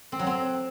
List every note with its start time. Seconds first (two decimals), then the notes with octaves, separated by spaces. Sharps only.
0.12 C4
0.19 F#3
0.27 C4